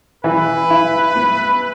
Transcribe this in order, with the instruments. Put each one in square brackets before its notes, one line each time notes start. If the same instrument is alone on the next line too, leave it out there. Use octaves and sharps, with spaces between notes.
[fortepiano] E3 [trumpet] B4
[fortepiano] E4
B3